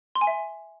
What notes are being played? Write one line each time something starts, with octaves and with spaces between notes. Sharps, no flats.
C6
G#5
E5